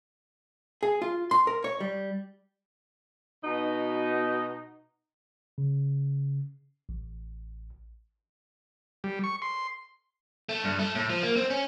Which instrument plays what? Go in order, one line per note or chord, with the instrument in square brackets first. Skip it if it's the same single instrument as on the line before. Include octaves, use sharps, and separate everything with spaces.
[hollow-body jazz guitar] G#4
F4
C6
A#4
C#5
G3
[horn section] B2 D#4
[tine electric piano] C#3
A1
[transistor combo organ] G3
C#6
C6
[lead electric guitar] A3
G2
A3
A2
F3
A#3
C4
C#4